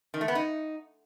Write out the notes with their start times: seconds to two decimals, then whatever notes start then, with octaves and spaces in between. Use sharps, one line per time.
0.14 D#3
0.21 A3
0.28 B3
0.35 D#4